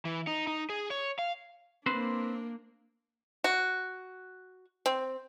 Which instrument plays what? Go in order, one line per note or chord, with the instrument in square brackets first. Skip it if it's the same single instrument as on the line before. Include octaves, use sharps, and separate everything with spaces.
[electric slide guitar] E3
D#4
D#4
G#4
C#5
F5
[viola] A#3 D4 [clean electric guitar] C4 B4 C5
[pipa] F#4
C4